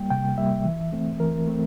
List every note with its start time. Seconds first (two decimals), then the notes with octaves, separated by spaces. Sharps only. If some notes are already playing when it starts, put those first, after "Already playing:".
Already playing: G3 A#3 G5
0.10 C3 G5
0.38 G3 A#3 E5
0.65 E3
0.92 A3 C4
1.20 E3 A#4
1.47 A3 C4